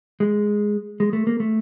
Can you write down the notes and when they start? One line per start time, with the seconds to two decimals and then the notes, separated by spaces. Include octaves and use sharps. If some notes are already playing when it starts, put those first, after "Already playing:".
0.20 G#3
1.00 G#3
1.13 A3
1.27 A#3
1.40 A3